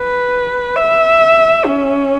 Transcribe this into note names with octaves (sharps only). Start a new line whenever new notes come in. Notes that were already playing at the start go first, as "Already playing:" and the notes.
Already playing: B4
E5
C#4